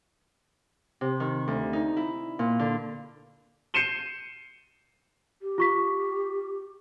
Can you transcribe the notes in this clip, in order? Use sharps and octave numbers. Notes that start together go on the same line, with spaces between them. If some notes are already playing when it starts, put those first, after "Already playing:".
C3
D#3
D2
D#4
E4
A#2
D3
G6 C7 C#7 D#7 E7 G7
G4
F4 C#6 B6